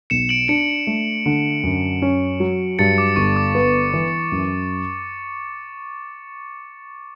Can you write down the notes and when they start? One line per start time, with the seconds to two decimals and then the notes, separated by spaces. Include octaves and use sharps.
0.10 B1 C#7 E7
0.29 D7 F#7
0.48 D4 C#7 E7
0.87 A3
1.26 D3
1.63 F#2
2.02 C#4
2.40 F#3
2.79 G2 A6 C#7
2.98 D6
3.16 G1 C#6
3.36 D6
3.55 B3
3.94 E3
4.32 F#2